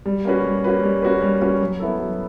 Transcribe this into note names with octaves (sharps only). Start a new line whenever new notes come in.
G3
A#3 C#4 F#4 B4
G3
A#3 C#4 F#4 B4
G3
A#3 C#4 F#4 B4
G3
A#3 C#4 F#4 B4
F#3
B3 E4 A4
F#3